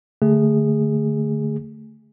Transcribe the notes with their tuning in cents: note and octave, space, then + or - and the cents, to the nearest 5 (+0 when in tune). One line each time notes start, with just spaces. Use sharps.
D3 +0 A3 +0 G#4 -15